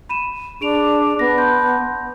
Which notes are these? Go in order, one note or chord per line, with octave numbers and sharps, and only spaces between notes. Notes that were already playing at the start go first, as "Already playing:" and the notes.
B5 D#7 E7
D4 G#4 D7 F7
B3 A#6
A5 C6 G6